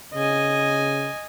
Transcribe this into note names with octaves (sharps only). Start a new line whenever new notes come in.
C#3 D#5 G#5